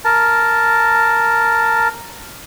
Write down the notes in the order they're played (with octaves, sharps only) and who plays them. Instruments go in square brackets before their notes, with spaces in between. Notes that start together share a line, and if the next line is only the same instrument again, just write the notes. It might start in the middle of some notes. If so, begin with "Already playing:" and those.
[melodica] A#4 A5